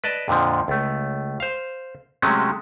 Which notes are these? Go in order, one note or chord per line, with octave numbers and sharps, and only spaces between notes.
B4 D5 D#5 A5
F2 A#2 D3 F3
C#2 A3
C5 F5
C3 F#3 G#3 A3 C#4